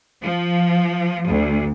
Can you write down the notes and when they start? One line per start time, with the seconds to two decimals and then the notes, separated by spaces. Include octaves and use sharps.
0.23 F3
1.27 D2